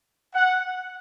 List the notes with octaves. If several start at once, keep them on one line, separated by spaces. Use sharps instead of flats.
F#5